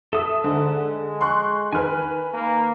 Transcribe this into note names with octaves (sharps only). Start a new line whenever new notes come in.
A4 E5 D#6 E6
G#2 D3
G#3
C6 C#6 F#6
D#3 B4 G#5 F6
A#3